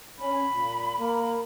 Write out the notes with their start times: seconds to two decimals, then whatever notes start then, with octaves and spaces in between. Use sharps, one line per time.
0.19 C#4 B5
0.52 A#2
0.97 A#3 A#4